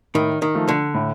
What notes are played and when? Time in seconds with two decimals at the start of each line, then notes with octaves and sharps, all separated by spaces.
0.15 A2 D#3
0.42 D#3
0.55 F3 A3
0.68 D3
0.94 A2